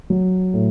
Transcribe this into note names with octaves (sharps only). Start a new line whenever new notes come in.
F#3
A2